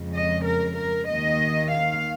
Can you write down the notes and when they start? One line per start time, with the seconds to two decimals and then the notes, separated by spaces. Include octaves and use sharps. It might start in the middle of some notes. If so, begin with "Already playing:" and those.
Already playing: F2 C#3 G#3
0.14 D#5
0.45 A#4
0.77 A#4
1.08 D#2 D#3 A#3 D#5
1.71 F5